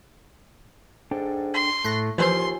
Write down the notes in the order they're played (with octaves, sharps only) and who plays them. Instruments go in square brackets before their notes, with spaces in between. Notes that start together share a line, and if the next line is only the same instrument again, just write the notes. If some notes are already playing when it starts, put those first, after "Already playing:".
[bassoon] G#2 [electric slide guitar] D4 A4 G5
[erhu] C6
[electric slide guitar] A2 [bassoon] A3 [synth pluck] F#6 A#6
[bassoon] D#2 [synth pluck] E3 F3 C5 [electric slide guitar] F4 G#5 [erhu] C6